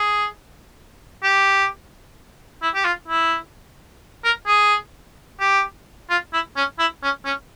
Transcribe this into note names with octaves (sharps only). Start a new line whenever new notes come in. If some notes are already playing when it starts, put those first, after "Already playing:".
Already playing: G#4
G4
E4
G4
F4
E4
A#4
G#4
G4
F4
E4
C#4
E4
C#4
C#4